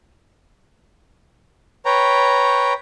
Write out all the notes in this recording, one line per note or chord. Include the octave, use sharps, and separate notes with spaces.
B4 C#5 G5 A#5